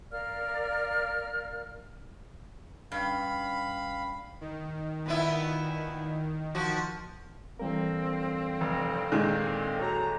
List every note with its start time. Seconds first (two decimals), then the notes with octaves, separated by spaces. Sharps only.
0.11 A#4 D5 F5 F6
2.92 G2 C#4 F5 G5 B5
4.41 D#3
5.06 A#2 B3 E4
6.55 F3 F#4
7.60 D3 E3 G3 A#3 C4 A#4
8.61 F1
9.12 A#2 D#3 G#3
9.79 F#4 A4 C#5 A#5